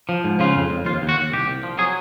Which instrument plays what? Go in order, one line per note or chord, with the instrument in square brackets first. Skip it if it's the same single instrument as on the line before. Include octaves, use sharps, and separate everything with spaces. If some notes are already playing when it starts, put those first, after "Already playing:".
[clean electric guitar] F3
G#2
C#3 F4
F2
F2
D#2 F4
D#2
F#4
D#2
C2 G4
C2
F3
F#3 G#4